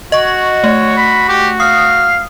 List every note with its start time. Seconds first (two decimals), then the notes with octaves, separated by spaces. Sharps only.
0.12 F#4 D#5 C#6
0.64 A3 C#5
0.97 B5
1.29 G4
1.60 F5 D#6